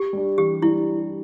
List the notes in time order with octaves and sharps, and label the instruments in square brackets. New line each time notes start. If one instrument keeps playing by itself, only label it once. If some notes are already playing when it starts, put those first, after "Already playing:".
Already playing: [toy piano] G4
[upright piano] G3 D4
[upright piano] E3 [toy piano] G4
[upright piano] G3 D4 [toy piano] E4